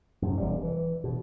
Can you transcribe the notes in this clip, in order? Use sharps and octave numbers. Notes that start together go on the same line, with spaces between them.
F#2 C3
E1 G3
E3
B2